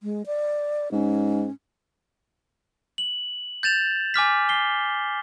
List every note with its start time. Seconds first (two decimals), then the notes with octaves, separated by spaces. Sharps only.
0.03 G#3
0.26 D5
0.92 G#2 C#4
2.98 F#7
3.63 G6 A6 E7 F7
4.14 G#5 D6 F6 B6
4.49 C7 G7